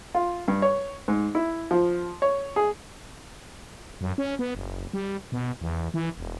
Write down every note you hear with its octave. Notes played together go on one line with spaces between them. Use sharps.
F4
G2
C#5
G#2
E4
F3
C#5
G#4
F#2
C#4
B3
F#1
G3
B2
E2
E3
E1